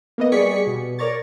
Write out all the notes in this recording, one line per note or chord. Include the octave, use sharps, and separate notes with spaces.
A#3 B3 D#5
G3 G#4 D5 C#6 B6 C#7
B2
A#4 C#5 D5 A#5 C#6 A6